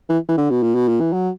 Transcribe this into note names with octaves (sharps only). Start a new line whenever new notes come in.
E3
E3
D3
B2
A#2
B2
A#2
E3
F#3